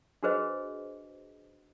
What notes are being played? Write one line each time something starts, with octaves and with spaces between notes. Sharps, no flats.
D4 F#4 G#4 B4 C5 D#5